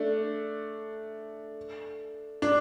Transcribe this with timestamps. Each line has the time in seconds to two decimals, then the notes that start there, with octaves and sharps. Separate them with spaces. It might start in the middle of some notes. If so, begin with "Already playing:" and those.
Already playing: A3 D4
2.42 D4